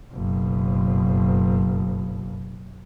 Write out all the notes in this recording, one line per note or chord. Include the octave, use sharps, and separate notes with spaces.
F#1 B2